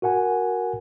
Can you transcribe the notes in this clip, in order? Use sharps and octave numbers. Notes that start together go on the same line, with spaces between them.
F#4 A#4 F#5 G#5